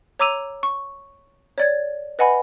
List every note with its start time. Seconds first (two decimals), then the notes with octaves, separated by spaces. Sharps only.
0.19 C#5 A#5 D6 E6 D#7 F7
0.63 C#6
1.58 C#5 D5 G#6
2.19 B4 D#5 F#5 G#5 B5